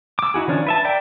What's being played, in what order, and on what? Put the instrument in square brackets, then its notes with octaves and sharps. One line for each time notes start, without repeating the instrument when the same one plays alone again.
[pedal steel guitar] D6 E6
D#4 E4 F#4 G#4
D#3 F3 C#4 D4
B4 E5 A5
A#4 D5 E5 G5